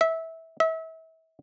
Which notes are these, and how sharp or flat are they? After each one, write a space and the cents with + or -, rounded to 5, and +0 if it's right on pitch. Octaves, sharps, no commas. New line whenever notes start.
E5 -20
E5 -35